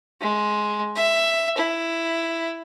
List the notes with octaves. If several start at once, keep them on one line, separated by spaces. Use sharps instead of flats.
G#3
E5
E4